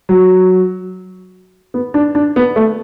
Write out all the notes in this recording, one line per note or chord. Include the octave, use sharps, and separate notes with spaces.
F#3
B3
D4
D4
B3
A3